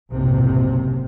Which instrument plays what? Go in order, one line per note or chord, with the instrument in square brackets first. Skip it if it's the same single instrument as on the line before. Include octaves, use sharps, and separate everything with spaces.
[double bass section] F#1 B1 A2 C3